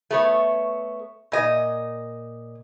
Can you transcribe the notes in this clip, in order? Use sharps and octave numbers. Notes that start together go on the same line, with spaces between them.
A3 B3 C#5
A#2 D#5